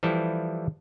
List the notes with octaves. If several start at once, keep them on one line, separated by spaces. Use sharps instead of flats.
E3 F3 G3 E4 A4